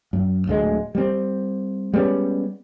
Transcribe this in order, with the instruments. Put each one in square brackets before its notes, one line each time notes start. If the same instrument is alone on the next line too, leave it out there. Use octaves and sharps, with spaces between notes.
[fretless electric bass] F#2
D1 D2 G#3
G3 C4
G3 G#3 B3 C#4